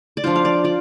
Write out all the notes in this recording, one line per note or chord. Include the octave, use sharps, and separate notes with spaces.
D5
F3 D4 F4 C5
F5
D5
F4 D5